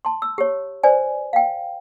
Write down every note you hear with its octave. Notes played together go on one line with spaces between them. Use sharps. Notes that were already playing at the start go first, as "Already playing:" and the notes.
A5 C6
E6
G4 C#5
B4 C5 D5 G#5
F5 G5